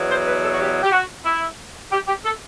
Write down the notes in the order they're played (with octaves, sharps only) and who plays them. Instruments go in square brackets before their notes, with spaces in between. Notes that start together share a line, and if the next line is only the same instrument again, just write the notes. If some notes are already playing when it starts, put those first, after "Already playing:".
Already playing: [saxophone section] E2 B2 F#3
C5
B4
A4
F#4
G4
G4
F#4
E4
G4
G4
A4